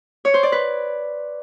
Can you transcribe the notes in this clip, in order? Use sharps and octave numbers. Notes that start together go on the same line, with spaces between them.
C#5
C5
D5
B4